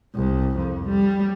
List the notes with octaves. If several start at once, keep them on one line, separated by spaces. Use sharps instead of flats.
C2
F2
G3